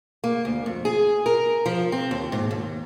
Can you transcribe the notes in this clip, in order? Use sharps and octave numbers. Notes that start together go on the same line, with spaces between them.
A#3
D2
F2
G#4
A#4
F3
C4
D#2
G#2
D#2